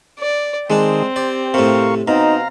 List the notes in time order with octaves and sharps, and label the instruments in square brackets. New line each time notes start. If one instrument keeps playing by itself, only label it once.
[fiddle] D5
[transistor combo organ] D#3 G#4 [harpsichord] G#3 D4 [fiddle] C4
[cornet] G4 [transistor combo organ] C5 [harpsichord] D5
[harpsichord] A2 C3 [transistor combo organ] A#4 F5 C#6
[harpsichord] B2 [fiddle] C4 [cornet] D#4 [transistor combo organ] F5 A#5